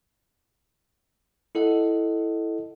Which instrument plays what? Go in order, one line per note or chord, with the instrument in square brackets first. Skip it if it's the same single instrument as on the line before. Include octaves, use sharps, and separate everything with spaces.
[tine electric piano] E4 A4 D#5 F#5